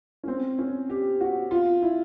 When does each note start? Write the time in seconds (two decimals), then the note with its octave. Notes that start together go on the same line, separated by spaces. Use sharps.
0.24 C#4
0.28 C4
0.59 C#4
0.90 G4
1.21 F#4
1.51 F4
1.82 E4